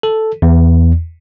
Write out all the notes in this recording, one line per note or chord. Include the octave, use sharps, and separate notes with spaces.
A4
E2